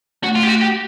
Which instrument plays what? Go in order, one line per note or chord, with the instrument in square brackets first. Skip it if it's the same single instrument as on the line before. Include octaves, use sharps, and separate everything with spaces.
[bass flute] A3 [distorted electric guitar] F#4
[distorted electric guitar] F4
G4
F#4
G4